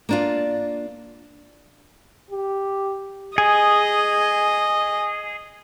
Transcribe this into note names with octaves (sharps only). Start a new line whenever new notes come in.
A#3 D4 F4
G4
G#4 D#5